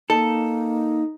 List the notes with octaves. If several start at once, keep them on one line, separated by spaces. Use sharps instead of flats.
A#3 D#4 A4